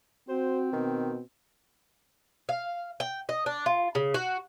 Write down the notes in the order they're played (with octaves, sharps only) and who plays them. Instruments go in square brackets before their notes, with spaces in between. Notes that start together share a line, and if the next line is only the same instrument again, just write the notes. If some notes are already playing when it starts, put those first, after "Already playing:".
[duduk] C4 [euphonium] F#4 [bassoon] C5
[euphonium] B2 [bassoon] D#3
[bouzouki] F5
G5
D#5
D4
F4
C#3
F#4